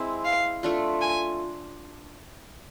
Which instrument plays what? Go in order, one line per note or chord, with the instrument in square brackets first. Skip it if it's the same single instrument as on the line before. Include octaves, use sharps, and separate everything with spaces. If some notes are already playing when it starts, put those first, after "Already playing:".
Already playing: [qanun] G#3 C4 E4
[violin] F5
[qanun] A3 D4 F4
[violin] G#5